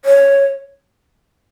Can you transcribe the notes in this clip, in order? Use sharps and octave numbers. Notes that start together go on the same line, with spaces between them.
C#5